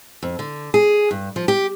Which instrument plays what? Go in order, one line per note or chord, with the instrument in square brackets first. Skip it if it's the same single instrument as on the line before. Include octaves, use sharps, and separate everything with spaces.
[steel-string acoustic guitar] F2
D3
G#4
G2
F3
G4